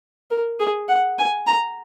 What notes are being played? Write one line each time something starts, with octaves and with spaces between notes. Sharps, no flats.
A#4
G#4
F#5
G#5
A#5